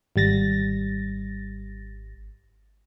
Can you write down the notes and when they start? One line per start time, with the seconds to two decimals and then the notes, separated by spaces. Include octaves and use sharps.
0.16 G#1 G3 A6 A#6